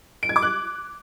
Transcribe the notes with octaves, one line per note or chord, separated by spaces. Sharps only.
D7
G#6
D6
F#6